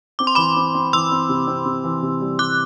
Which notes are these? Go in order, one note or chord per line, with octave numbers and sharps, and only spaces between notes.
C4 D6
C6
E3 B5 D6
C4
C4
E3 C6 E6
C4
C3
C4
C3
E3
C3
G3
G3 D6 F#6